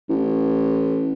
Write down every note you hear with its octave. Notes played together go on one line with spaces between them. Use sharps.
A1